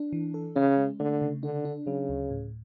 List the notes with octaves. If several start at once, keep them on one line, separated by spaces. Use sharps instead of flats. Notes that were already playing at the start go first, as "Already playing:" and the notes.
Already playing: D4
E3
A4
C#3 C#4
G#3
D3 A3
C#3
D3 D4
D4
C#3 F#3
D2
A2